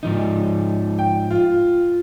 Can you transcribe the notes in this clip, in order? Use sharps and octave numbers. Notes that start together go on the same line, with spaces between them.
G#2 F3 D#4
G5
F4